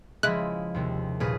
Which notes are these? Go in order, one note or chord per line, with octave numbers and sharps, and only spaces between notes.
C#3 F3 G#3 E4 F#6 B6
D#2 C3 D#4
D#1 A#2 C#3 G#4 B4